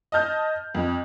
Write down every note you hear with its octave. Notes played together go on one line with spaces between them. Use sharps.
D#5 A5 F6 G6
F2